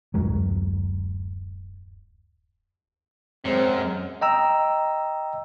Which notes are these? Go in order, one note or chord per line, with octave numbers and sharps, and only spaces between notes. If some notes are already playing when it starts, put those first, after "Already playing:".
D1 F#2 F#3 G#3
F#2 G#3 C4
D#5 G5 A#5 E6